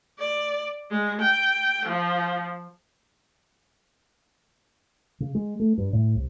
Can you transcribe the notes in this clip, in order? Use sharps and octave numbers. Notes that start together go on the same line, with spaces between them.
D5
G#3
G5
F3
C#3
G#3
A3
G2
A2
C2